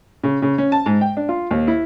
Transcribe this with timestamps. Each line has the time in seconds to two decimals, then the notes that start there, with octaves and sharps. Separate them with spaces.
0.24 C#3
0.42 C#3
0.58 C#4
0.72 A5
0.86 G#2
1.01 G5
1.17 D4
1.29 F4
1.51 D#2
1.67 E4